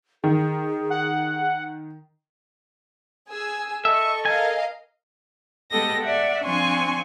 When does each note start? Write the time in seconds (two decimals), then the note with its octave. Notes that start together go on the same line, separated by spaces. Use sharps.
0.24 D#3 G#4
0.90 F#5
3.30 G#4 G#5 E6
3.85 A4 D#5 E5 C#6
4.25 A#4 D#5 F5 G#5
5.71 G#3 B3 G4 A4 D#5 A#6
6.03 D5 E5 F#5
6.44 F3 C4 D4 G#5 C6 C#6